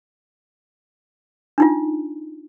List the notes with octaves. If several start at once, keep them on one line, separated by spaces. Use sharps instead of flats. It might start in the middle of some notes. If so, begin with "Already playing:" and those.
D4 D#4 F4